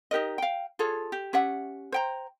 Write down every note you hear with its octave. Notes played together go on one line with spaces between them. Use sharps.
D#4 G4 A#4 D#5
F5 G5
F4 G#4 A4 C#5
G4
C#4 G4 E5 F#5
C5 G5 A#5